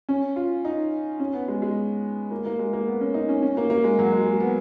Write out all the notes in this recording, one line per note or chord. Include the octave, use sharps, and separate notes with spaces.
C#4
F4
D#4
C#4
B3
G#3
G#3
A#3
A#3
G#3
A#3
B3
C#4
D#4
C#4
C#4
A#3
A#3
G#3
F#3
G#3
G#3
B3